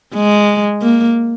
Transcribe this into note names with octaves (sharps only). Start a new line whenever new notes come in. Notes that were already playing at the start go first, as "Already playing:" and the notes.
G#3
A#3